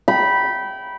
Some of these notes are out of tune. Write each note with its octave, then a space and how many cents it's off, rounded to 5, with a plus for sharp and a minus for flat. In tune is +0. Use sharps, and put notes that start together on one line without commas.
G5 -25 B5 -10